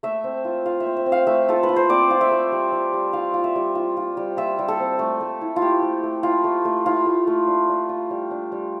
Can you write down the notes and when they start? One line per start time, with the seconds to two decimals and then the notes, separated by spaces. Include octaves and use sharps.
0.03 A3 E5
0.24 C4
0.45 F4
0.66 F4 F5
0.80 E5
0.86 C4
0.97 E5
1.06 C4
1.12 F5
1.27 A3 E5
1.49 F4 A4
1.63 B4
1.69 F4
1.76 C5
1.89 C4 D5
2.10 F4
2.21 E5
2.31 A3
2.52 G3
2.72 G3
2.93 G3
3.13 F4 F5
3.34 F4
3.44 E5
3.55 G3
3.75 F4
3.97 F4
4.17 G3
4.37 F4 E5
4.59 G3
4.68 A4
4.80 C4
4.99 A3
5.21 A3
5.41 E4
5.56 F4
5.62 E4 G4
5.82 A3
6.03 A3
6.23 E4 F4
6.44 A3
6.65 A3
6.86 E4 F4
7.06 A3
7.27 A3
7.47 D4
7.69 D4
7.89 F4
8.10 G3
8.31 D4
8.52 G3